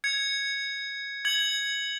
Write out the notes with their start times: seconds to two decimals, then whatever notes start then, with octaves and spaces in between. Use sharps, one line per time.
0.04 G#6 C#7
1.25 G#6 C#7 F#7